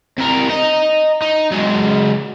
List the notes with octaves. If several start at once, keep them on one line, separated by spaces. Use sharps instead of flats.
C3 A#4
D#5 A#5
D#4
F#3 G#3